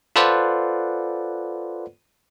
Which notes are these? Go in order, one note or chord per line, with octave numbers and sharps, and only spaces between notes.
F4 A4 B4 C5 D5 F#5